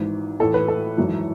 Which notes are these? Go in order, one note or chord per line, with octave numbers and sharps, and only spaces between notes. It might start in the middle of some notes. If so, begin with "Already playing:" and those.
Already playing: G#1 G#2 E3
A1 A2 E3 A4
B4
A4
G#1 F#2 E3